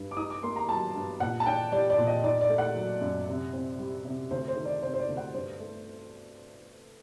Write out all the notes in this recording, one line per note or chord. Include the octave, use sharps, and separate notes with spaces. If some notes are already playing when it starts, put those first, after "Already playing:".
Already playing: G2
D6
D#4 D#6
D6
A#3 C6
A#5
F#3 A5
G2
A#2 F#5
A5
D4 G5
G3 D5
D5
A#2
D#5
D#4 D5
D5
A3
F#5
F#3
F#2
C3
C4
G3
C3
D2 C5
C5
D#3
D5
C3 C5
C5
D5
D2
F#5
G2 C5
A3